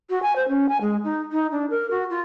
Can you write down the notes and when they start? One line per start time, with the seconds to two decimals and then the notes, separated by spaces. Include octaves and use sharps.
0.10 F#4
0.22 G#5
0.36 C5
0.48 C#4
0.69 G#5
0.81 G#3
1.04 D#4
1.32 D#4
1.52 D4
1.70 A#4
1.91 F#4
2.10 F4